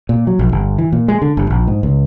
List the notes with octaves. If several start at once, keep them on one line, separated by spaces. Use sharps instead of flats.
A#2
F#3
A#1
G1
E3
A#2
G#3
D3
G1
A#1
G#2
C#2